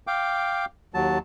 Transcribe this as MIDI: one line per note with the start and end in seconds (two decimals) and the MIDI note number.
0.07 0.65 77
0.07 0.65 79
0.07 0.65 86
0.94 1.19 39
0.94 1.19 54
0.94 1.19 81